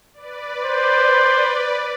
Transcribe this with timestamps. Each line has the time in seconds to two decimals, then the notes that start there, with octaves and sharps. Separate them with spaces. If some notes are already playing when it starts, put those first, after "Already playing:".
0.14 B4 D5
0.65 C5